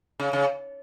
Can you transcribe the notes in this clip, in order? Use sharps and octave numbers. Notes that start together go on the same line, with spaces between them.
C#3
C#3